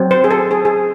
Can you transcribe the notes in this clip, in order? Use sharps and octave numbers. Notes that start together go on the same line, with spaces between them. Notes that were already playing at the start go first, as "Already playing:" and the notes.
Already playing: F#3 C4
C5
G#4
A4
G#4
G#4